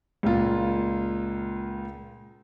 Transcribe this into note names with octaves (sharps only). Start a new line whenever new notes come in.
C#2 A#2 A#3 F4